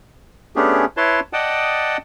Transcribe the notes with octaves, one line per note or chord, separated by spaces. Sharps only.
A3 B3 C#4 D4 G4 G#4
E4 B4 C#5 A5 C6
D5 D#5 F#5 G5 A5 D#6